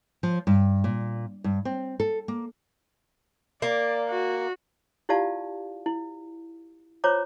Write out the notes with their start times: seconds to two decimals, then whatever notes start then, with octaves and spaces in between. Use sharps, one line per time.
0.23 F3
0.47 G2
0.84 A#2
1.44 G2
1.65 C4
2.00 A4
2.28 A#3
3.62 A#3 D5
4.10 F#4
5.09 E4 F4 G4 D5 F5 A5
5.86 E4
7.04 F4 C5 C#5 A#5 D6